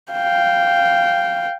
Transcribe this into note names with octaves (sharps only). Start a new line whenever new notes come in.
F5 G5